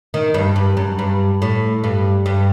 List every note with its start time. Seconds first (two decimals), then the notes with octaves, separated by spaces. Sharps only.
0.14 D#3
0.34 G2
0.56 G2
0.77 F#2
0.99 G2
1.42 A2
1.84 G2
2.26 G2